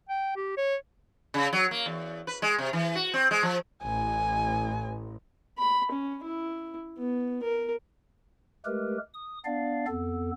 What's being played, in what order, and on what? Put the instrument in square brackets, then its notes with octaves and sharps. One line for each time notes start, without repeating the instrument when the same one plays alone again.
[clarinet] G5
G4
C#5
[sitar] C#3
F#3
A#3
E2
B4
G#3
C3
E3
F#4
C4
G#3
F3
[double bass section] A1 [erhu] G#5
[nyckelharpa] B5
C#4
E4
B3
A#4
[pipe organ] G#3 A3 G4 A#4 B4
D#6
B3 D4 D5 F5
F2 B3 A4